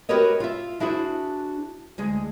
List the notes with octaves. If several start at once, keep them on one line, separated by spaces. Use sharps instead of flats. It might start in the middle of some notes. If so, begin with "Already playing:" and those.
F#4 G4 A#4 B4 C#5 D#5
F4 E5
D4 E4 F#4 G#4 C5
D2 G#3 G#4